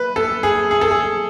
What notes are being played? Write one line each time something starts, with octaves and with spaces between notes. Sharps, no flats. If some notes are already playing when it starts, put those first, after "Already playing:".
Already playing: B4
A4
G#4
G#4
A4
G#4